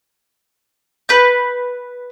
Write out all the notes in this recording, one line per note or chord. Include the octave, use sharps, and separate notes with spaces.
B4 G6